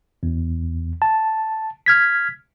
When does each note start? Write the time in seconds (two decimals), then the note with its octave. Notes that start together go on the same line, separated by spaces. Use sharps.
0.23 E2
1.02 A5
1.86 F6 G#6 B6